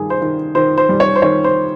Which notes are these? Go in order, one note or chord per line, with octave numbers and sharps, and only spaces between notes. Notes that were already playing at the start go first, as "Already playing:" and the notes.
Already playing: G2 D#3 G3 G#4
C5
D#3
D#3 C5
C5
G3
C#5
C5
D#3 C#5
C5